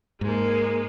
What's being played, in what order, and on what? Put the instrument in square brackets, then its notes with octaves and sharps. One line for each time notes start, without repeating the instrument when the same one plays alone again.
[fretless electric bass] G#2 [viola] G#3 A#3